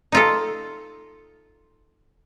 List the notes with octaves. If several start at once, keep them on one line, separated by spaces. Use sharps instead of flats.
D#4 F4 A4